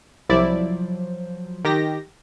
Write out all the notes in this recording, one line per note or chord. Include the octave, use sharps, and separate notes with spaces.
C2 F3 F#3 E4 C5 D5
D#3 G4 A#6